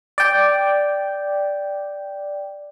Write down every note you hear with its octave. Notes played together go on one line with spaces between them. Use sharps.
D5 G5